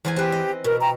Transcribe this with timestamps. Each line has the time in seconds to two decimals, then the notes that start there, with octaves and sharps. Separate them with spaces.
0.05 E2 C5 G#5
0.16 C4 G4 B4
0.32 D#5
0.64 B2 A#4
0.81 G5 A#5